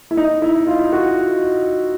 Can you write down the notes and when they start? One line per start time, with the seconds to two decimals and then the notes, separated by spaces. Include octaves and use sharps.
0.11 E4
0.17 D#4
0.42 E4
0.67 F4
0.93 F#4